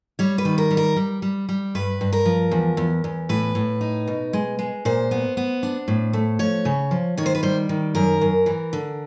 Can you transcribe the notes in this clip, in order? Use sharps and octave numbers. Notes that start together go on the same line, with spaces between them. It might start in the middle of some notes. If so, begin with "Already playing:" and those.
G3 C#5
B4
D#3
A#4
G3
A#4
G3
G3
G3
G2 B4
G2
A#4
F3
E2
E2
E2
A2 B4
A2
D#4
B2
G#3
G#3
A#2 C5
B3
B3
D4
A2
A3
F3 C#5
C#3
F3
D#3 C#5
C5
B4
G3 C5
D#3
F#2 A#4
F#2
E3
D3